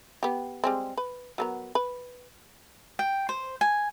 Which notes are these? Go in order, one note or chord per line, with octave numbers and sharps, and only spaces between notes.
B3 G4
G3 G#3 C4
B4
F#3 B3 A#4
B4
G5
C5
G#5